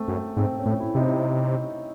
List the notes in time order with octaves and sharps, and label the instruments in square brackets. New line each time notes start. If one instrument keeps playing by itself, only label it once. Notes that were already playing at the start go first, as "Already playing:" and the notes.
Already playing: [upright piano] A3 C4
[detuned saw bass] F#2
[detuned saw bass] G#2 [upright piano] C4
[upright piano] C#4
[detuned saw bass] A2
[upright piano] E4
[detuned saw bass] C3 [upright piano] D#4
[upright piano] E4